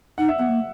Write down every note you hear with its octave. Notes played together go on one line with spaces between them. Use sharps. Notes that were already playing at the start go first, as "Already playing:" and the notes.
D#4 F#5
E5
B3 F#5
A#3